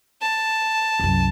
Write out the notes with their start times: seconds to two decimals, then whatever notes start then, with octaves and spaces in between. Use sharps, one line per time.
0.22 A5
1.00 C2 F#2